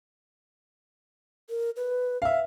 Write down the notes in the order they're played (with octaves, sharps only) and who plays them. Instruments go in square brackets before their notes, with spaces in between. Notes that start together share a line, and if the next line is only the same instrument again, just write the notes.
[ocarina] A#4
B4
[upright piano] E5 F5